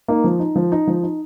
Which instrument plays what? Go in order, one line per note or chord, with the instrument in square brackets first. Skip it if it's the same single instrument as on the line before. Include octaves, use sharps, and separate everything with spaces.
[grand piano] A#3 D#4
F3
D#4
F3
D#4
F3
D#4